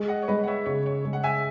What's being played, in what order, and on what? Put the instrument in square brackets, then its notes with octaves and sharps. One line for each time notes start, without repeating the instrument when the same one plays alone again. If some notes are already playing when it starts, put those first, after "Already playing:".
Already playing: [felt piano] G#3
[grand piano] D#5 F#5
C#5
[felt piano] G#3 [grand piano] B4 D#5
[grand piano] F#5
C#5 E5
[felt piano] C#3 [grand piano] C#5
[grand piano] C#5
[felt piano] G#3
[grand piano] F#5
E5 G#5